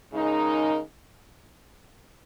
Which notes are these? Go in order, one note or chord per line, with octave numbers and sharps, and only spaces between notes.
C#3 G#3 D#4 A#4